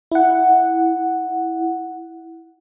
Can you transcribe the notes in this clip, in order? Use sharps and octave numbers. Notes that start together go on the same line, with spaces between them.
E4 F#5